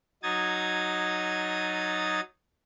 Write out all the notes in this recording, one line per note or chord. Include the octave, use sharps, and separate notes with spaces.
F#3 D#4 D#6 G#6 A6